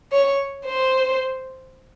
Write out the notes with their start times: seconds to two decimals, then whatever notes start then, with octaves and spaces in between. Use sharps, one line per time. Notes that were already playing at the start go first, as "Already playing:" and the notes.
0.12 C#5
0.66 C5